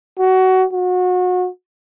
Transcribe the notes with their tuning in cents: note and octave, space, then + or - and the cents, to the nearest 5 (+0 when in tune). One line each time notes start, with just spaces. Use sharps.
F#4 +20
F#4 -30